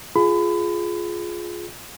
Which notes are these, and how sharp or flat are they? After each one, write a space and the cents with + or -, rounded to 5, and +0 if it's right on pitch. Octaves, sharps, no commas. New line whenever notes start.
F4 +0 G#4 +15 B5 +30